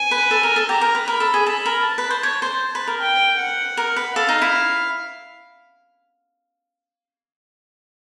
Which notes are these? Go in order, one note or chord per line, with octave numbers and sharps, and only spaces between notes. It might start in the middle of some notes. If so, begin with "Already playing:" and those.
Already playing: G#5
B4
A4
A#4
A4
G4 A#5
A#4
B4
A#4 B5
A4
G#4
A4 B5
A#4
A5
B4
C5
C#5
C5
B4
A#4
G5
F#5
A#4
B4
A4 F5
D#4
E4